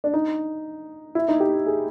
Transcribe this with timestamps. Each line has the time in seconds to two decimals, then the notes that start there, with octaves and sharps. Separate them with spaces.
0.04 D4
0.14 D#4
1.15 E4
1.28 D#4
1.40 G4
1.66 G#4